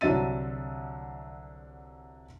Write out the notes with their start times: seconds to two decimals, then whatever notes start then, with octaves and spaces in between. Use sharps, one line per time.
0.01 C2 D3 F#3 E5 A6 D#7